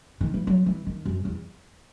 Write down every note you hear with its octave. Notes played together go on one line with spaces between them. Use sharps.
D#3
E3
F#3
E3
D#3
F#2
E2